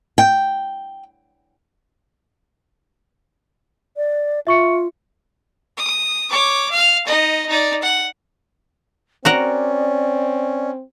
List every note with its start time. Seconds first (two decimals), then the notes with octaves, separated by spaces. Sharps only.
0.18 G5
3.97 D5
4.47 F4 E5 C#6 C#7
5.77 D#6
6.30 C#5 D6
6.70 F5 F6
7.06 D#4 D#5
7.49 D#4 D5
7.82 F#5
9.25 C4 C#4 F#4 A#4 D5 F#5